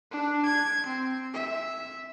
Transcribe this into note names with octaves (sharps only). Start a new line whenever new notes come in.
D4
G#6
C4
E5